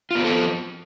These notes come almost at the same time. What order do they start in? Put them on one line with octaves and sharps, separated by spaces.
F4 B3 C4 A4 F3